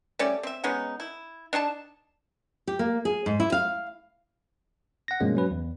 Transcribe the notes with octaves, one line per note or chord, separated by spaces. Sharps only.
G3 A3 C#4 D5
C4 E5
G#3 B3 C#4 D#4
E4
D4 D#4 G#5 A5
G4
A#3
G#4
G#2
E4
F5
F#5 A#6
G2 B2 F3 G#3 A#3 C#4
F#3 C#4 B4
E2